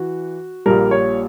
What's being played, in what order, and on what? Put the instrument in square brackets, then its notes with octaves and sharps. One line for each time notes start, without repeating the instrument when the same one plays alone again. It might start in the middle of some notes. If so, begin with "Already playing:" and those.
Already playing: [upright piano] E3 F#4
A#1 A#2 G3 A#4
C#5